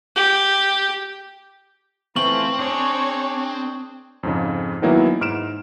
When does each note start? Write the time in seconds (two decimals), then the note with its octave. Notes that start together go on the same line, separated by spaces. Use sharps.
0.16 G4
2.16 E3 A3 C4 F4 B4 C#6 F#7
2.59 D4 G#4 C#5
4.23 F2 G#2 C#3
4.82 D#3 E3 F#3 A#3 B3 E4
5.21 G#2 F6 D7 E7